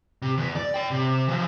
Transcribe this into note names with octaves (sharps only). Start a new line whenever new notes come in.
C3
E2 B3
D5
C#5 G5
C3
E3 F3